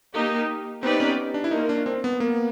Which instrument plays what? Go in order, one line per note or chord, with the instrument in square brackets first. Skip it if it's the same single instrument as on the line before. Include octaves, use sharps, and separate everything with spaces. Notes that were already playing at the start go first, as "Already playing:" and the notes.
[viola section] A#3 D#4 G4
[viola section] B3 D#4 G4 B4 D5 [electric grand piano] C4
[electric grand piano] C#4
D4
E4
[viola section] A#3 C#4 F4 A#4 [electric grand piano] D#4
[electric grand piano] D4
C4
B3
[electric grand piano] A#3 [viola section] B3